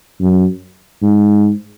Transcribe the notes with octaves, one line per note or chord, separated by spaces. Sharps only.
F#2
G#2